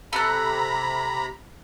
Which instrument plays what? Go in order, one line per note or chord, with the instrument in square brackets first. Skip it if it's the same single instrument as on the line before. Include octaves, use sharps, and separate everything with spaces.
[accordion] C3 A#5 B5 [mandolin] A4 F#6